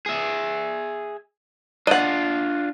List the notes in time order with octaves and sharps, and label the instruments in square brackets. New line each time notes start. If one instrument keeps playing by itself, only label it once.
[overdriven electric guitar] G#4 E5
[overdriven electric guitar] D4 F4 [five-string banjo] D#5 F#5